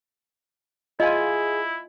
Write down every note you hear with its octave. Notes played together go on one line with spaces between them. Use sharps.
E4 F4 G#4 D#5 G#5